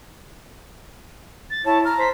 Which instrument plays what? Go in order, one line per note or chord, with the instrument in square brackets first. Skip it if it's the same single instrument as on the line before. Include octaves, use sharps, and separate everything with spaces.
[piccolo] A6
[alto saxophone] E4 [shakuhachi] C#5 [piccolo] A5
[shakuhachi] A#5 [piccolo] F6
[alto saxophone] C5 [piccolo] B6